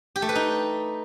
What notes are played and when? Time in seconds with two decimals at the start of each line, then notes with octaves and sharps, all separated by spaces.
0.16 G4
0.22 A3
0.29 B4
0.35 D#4